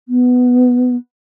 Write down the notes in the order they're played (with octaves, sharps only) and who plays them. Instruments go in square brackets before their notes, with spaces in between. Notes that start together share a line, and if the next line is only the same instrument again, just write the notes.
[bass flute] B3